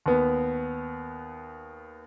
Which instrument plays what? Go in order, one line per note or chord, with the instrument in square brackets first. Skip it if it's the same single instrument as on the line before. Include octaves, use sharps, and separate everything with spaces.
[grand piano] D#2 B3